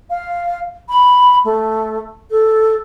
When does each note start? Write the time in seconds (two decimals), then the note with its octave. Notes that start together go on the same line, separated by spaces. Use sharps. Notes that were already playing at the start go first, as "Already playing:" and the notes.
0.09 F5
0.88 B5
1.44 A3
2.30 A4